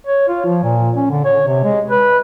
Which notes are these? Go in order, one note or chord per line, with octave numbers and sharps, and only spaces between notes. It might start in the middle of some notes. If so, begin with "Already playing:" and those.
C#5
F4
F3
A#2
C#4
D3
C#5
C3
G#3
B4